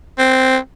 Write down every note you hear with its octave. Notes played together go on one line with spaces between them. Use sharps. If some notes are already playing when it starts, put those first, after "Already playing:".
C4